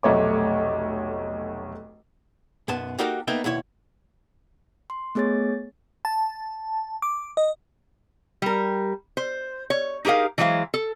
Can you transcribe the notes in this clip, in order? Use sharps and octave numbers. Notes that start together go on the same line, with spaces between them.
F1 B1 A3 C#5 D6
B1 F#2 B3 A5
A#3 D#4 F#4 G4 A4 A#4
A#3 B3 D#4 A4 E5 G5
D#2 B2 E4 C#5
C6
A3 B3 G#4 C#5 A6
A5
D6
D#5
G3 A#4
C5
C#5
D#4 G4 G#4 A#4 F5
E3 F#3 G#3 C5 F5
A4